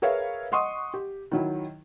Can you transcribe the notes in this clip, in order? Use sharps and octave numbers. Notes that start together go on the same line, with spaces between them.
G#4 A#4 B4 C#5 E5 F5
D#5 F#5 C6 C#6 D#6
G4
D#3 F#3 E4